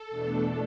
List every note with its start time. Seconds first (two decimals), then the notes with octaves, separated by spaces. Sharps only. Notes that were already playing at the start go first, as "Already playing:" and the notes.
Already playing: A4
0.09 E2 B2 A3 D4